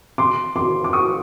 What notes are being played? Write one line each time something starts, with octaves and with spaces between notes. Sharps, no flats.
C6 D6
C6 D6
D6
C#6 D#6